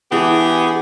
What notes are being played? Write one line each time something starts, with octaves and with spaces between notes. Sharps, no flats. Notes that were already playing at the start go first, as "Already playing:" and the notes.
E3 B3 D4 G4 G#4